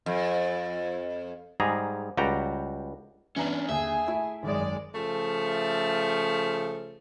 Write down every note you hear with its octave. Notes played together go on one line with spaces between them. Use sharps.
F2
G#2 G3 G#4 A#5
C#2 G3 F#4 G5 A#5
E3 B3 C#4 D4 A#5
D#2 D3 G#4 E5 G#5 D#6
A3 E4
G#1 F#2 G#3 D5
C#3 F3 A3